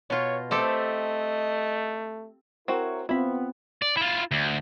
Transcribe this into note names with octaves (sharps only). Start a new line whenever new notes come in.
B2 F4 C#5
A3 C4 G4 A4 D#5
C4 E4 F#4 A#4 C#5
B3 C4 E4 F4 B5
D5
E4 F4
D2